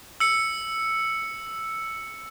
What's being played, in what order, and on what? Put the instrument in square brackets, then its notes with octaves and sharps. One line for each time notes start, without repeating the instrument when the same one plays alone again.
[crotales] E6 C#7